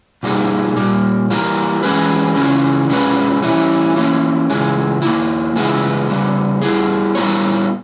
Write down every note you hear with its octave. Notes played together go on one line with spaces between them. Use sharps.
B2 G3 A#3 D#4 G#4
A#2 G3 A#3
E3 G3 A#3 E4 A#4
E3 G#3 C#4 G#4 B4
C#3 E3 G#3 C#4
B2 G#3 C#4 G#4 B4
E3 G3 C#4 E4
E3 A#3 C#4
C#3 E3 G#3
D#3 A#3 E4
C#3 E3 G#3 B3 E4
C#3 G3 B3
G3 B3 E4 G#4
G3 B3 E4 A#4 C#5